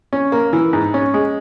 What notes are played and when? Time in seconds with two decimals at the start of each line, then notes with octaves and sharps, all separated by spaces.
0.13 C#4
0.32 A#3
0.53 E3
0.73 G#2
0.94 C#4
1.14 G#3